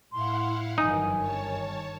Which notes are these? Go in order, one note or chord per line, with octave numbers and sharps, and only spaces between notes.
A2 E4 F5 F#5 C6
G1 F#2 D#3 E3 G3 D#4 G#5
C#5 A5